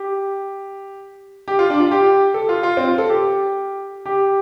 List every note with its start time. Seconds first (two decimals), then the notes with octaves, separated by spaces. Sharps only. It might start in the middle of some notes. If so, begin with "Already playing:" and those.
Already playing: G4
1.48 G4
1.59 F4
1.70 D4
1.80 F4
1.91 G4
2.34 A4
2.49 F4
2.63 F4
2.77 C4
2.88 F4
2.98 A4
3.09 G4
4.06 G4